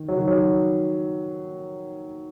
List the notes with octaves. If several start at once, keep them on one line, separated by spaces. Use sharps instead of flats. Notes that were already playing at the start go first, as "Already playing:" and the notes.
Already playing: D#3
F#3
D#3
F#3